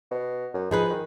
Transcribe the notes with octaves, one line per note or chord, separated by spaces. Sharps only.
B2
F#2
F3 D#4 G#4 B4
D#3